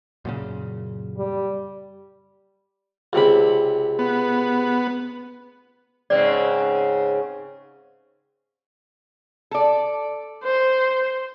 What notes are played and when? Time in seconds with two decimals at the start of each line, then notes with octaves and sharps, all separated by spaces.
0.25 F#2 A#2 C#3
1.18 G3
3.13 C#2 C3 B5
3.99 B3
6.10 G#2 C#3 C4 D5
9.51 A4 D5
10.44 C5